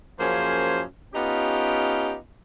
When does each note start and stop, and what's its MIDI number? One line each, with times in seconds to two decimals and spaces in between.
0.19 0.82 42
0.19 0.82 53
0.19 0.82 58
0.19 0.82 61
0.19 0.82 68
0.19 0.82 72
1.15 2.15 59
1.15 2.15 61
1.15 2.15 63
1.15 2.15 65
1.15 2.15 67